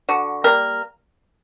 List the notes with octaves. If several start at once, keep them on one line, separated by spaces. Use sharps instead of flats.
D3 F#4
G3 A#3 A#4